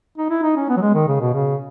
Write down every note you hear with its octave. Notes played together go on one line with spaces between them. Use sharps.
D#4
E4
D#4
C#4
B3
F#3
G#3
D#3
C#3
B2
C#3